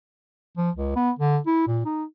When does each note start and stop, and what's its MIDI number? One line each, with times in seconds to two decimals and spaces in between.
0.57 0.70 53
0.76 0.94 37
0.96 1.11 59
1.19 1.38 50
1.46 1.65 64
1.67 1.80 46
1.85 2.04 63